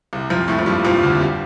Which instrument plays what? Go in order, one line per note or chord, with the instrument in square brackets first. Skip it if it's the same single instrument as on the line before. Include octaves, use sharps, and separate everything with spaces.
[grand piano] C2 C3
F2 F3
A2 A3
F3
G2 G3
F2 F3
D2 D3
G2 G3